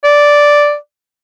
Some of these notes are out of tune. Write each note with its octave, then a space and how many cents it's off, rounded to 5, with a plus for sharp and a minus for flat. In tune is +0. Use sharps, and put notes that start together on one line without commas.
D5 -5